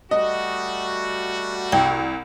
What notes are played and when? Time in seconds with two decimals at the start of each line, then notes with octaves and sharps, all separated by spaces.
0.11 G3 A3 F#4 D#5
1.72 C2 G5